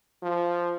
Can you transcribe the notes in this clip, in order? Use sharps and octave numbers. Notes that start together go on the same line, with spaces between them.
F3